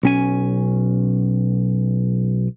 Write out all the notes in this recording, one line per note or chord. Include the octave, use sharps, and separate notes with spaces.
B1 C#4 G#5